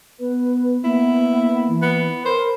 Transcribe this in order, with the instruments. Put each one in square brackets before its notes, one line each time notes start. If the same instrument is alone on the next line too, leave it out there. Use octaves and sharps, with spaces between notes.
[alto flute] B3 [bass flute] B4
[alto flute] A#3 [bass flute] B3 [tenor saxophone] E4
[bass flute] E3
[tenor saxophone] B3
[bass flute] A#4 [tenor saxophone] C5 [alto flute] B5